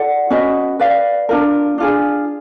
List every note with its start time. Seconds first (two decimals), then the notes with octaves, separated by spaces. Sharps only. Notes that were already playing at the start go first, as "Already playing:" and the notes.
Already playing: F4 A4 D5 F#5
0.30 C#4 F#4 B4 D#5
0.79 B4 D5 F5
1.29 D4 F4 A#4
1.78 D4 F4 G#4